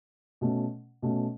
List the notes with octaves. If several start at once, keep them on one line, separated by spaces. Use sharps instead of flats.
B2 A3 C#4
B2 A3 C#4